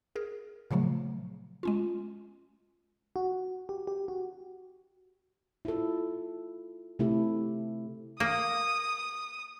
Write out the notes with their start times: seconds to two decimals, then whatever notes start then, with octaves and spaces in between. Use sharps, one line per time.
0.16 G#4 A#4
0.71 A#2 C#3 F3 F#3 A3
1.63 G#3 C#4 F4
3.16 F#4
3.69 G4
3.87 G4
4.08 F#4
5.65 E4 F4 A4
6.99 C3 A3 C4 E4 G4 A4
8.20 A#3 D#6